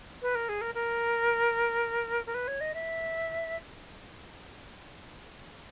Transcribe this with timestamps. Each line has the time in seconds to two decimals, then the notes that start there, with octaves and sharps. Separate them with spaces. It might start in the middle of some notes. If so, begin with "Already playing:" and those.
0.22 B4
0.35 A#4
0.49 G#4
0.61 A#4
0.74 A#4
2.26 A#4
2.34 B4
2.47 C#5
2.60 D#5
2.74 E5